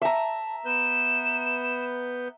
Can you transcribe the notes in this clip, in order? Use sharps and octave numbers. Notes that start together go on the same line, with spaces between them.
E5 A5 A#5
B3 B4 G6 E7